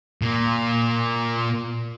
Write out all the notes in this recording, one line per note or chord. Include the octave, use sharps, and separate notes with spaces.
A#2 A#3